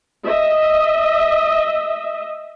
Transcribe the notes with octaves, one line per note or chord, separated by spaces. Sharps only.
D#5 E5